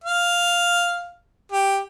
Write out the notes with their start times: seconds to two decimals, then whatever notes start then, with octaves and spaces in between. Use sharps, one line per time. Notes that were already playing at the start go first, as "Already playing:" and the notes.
0.04 F5
1.52 G4